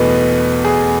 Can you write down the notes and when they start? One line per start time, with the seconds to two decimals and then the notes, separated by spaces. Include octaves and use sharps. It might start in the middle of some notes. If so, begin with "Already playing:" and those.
Already playing: E2 B2 A3 B4
0.65 G#4